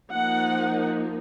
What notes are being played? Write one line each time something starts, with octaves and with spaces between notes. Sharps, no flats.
F3 A#3 D#4 F#5